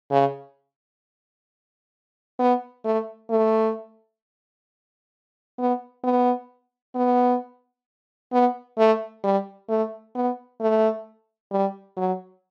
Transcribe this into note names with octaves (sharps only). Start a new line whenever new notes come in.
C#3
B3
A3
A3
B3
B3
B3
B3
A3
G3
A3
B3
A3
G3
F#3